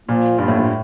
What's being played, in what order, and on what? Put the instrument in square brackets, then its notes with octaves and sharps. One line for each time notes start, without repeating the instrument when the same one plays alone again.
[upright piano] A#2 [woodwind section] F3 A#3 F4
[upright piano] G2 [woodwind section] F3 A#3 F4
[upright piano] A2
A2